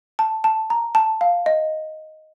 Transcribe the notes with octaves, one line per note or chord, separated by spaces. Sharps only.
A5
A5
A#5
A5
F5
D#5